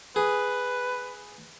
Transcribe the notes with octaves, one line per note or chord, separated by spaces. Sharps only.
G#4 B4